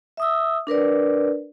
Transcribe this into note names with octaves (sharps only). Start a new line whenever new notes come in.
E5 D#6 E6
D4 A#4 B4 D5